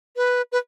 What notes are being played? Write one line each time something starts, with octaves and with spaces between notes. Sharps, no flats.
B4
B4